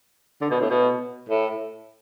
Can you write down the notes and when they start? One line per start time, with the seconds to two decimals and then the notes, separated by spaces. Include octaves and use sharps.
0.41 D3
0.51 B2
0.61 A2
0.70 B2
1.29 A2